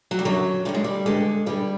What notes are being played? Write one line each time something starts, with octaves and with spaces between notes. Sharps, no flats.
F#3
G3
F#2 D3 F#3
F#2 D3 G3
G#3
G3
G2 D3 G#3
G2 D3 G3